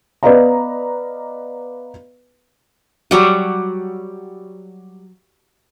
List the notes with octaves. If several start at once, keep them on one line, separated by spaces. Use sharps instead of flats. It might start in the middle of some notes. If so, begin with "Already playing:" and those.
B3 B4 D5 D#5 F5 A#5
F#3 G3 F#5